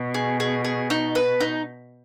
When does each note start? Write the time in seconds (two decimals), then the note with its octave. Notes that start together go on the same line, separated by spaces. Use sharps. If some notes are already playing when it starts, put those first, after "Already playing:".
Already playing: B2
0.14 G#4
0.40 G#4
0.64 G#4
0.90 D#4
1.15 B4
1.40 D#4